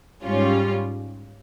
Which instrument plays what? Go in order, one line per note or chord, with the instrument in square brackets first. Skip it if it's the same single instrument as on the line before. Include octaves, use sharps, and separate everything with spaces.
[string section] G#2 G3 C#4 F4